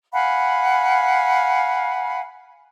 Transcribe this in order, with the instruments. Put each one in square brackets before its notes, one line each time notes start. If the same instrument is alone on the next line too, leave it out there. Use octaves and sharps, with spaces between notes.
[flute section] F5 F#5 G#5 B5